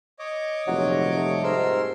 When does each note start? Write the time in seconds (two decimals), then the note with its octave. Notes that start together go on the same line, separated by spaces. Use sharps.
0.19 C#5 D#5 D6
0.67 F1 A#2 D#3 E3 F#3
1.15 G3 A3
1.43 G#2 A#4 C6 E6